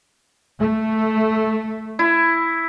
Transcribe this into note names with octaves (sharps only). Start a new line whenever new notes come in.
A3
E4